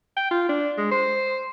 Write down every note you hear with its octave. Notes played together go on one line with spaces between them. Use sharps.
G5
F4
D4
G#3
C5